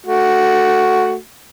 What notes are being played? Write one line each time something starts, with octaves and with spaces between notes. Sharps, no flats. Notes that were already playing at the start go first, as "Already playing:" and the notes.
A3 F#4